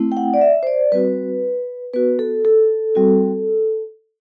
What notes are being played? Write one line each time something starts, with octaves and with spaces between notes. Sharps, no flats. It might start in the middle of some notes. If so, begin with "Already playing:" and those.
Already playing: A3 C4 E4
G5
F#5
D5
E5
C5
D5
G3 C4 F#4 B4
B3 F#4 B4
A4
A4
G3 C4 F#4